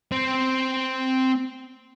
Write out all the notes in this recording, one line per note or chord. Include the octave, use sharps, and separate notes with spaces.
C4